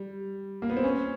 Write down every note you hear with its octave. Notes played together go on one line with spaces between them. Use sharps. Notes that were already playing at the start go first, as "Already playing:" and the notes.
Already playing: G3
A#3
B3
C4
C#4